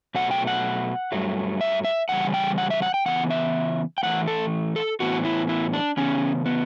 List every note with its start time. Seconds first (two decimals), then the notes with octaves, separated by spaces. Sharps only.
0.15 B2 F#3 A3 F#5
0.31 G5
0.47 F#5
1.12 G2 F#3 A3
1.61 E5
1.85 E5
2.09 C#3 E3 G3 F#5
2.34 G5
2.58 F#5
2.70 E5
2.82 F#5
2.94 G5
3.06 C#3 E3 B3 F#5
3.30 E5
3.98 G5
4.03 A2 E3 A3 F#5
4.28 A4
4.76 A4
5.00 A2 E3 B3 F#4
5.25 E4
5.49 E4
5.73 D4
5.97 C#3 E3 B3 C#4
6.46 B3